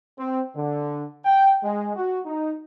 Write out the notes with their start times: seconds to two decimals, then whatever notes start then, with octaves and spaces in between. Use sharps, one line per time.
0.19 C4
0.56 D3
1.25 G5
1.64 G#3
1.96 F#4
2.26 D#4